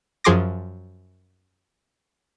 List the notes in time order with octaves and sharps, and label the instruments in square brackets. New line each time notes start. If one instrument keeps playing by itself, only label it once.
[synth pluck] F#2 F3 G#4 C6 D6 A#6